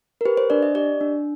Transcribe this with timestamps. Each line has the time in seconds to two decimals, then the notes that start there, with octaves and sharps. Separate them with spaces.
0.21 A#4
0.25 G4 B4
0.37 C5
0.50 D4 D5
0.63 D#5
0.75 G4 D5
1.01 D4